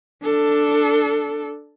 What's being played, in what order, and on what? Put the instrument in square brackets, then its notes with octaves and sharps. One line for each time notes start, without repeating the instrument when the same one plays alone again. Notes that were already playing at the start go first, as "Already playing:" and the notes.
[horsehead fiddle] D4 A4